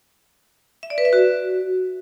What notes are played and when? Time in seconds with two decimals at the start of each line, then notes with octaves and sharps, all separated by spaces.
0.83 E5
0.90 D5
0.98 B4
1.05 E5
1.13 F#4